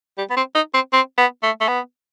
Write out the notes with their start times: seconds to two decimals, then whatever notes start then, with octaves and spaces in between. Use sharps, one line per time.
0.18 G3
0.30 B3
0.36 C4
0.55 D#4
0.74 C4
0.93 C4
1.18 B3
1.43 A3
1.61 A3
1.68 B3